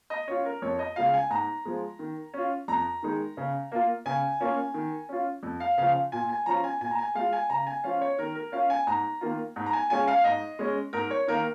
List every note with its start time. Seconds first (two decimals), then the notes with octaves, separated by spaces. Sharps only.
0.10 D#5
0.28 C#4 F4 C#5
0.45 A#4
0.62 F2 C#5
0.79 D#5
0.96 C#3 G#3 F4 F5
1.14 G#5
1.30 G#2 A#5
1.65 F3 G#3
1.99 D#3
2.34 C#4 F4
2.68 F2 A#5
3.03 D#3 G#3 D#4
3.37 C#3
3.72 A#3 F4
4.06 C#3 G#5
4.40 A#3 C#4 F4
4.74 D#3
5.09 C#4 F4
5.43 F2
5.60 F5
5.78 C#3 F3 F5
6.12 A#2 G#5
6.29 G#5
6.46 F3 C#4 F4 A#5
6.64 G#5
6.81 A#2 G#5
6.91 A#5
6.99 G#5
7.15 G#3 F4 F5
7.33 G#5
7.50 C#3 A#5
7.67 G#5
7.84 F3 C#4 F4 F5
8.01 C#5
8.19 D#3 A#4
8.35 A#4
8.52 C#4 F4 F5
8.70 G#5
8.87 G#2 A#5
9.21 D#3 A#3 F4
9.56 G#2
9.66 A#5
9.73 G#5
9.90 G#3 C#4 F4 G#5
10.08 F5
10.24 G#2 D#5
10.59 G#3 C#4
10.93 G#2 A#4
11.11 C#5
11.28 D#3 A#3 D#4 A#4